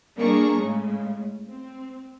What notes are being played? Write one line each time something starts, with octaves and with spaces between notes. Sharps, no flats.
G3 A#3 D4 G#4 A#5 C#6
A2 C#3 G#3
C4